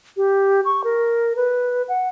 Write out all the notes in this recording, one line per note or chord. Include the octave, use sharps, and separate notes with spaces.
G4
C#6
A#4
B4
F#5